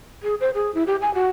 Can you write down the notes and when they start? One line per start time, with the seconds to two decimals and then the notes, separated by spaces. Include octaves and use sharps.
0.23 G#4
0.40 C5
0.54 G#4
0.74 E4
0.87 G4
1.02 G#5
1.14 F#4